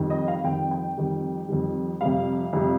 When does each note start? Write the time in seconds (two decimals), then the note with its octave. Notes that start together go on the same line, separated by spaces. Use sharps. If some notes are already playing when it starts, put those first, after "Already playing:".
Already playing: F2 D#3 G3
0.10 D#5
0.28 F5
0.44 F2 D#3 G3 G5
0.71 G5
0.97 F2 D#3 G3
1.49 F2 D#3 G3
2.01 F2 C3 G3 F5
2.53 F2 C3 G3